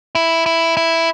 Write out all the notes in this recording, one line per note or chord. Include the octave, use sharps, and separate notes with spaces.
E4
E4
E4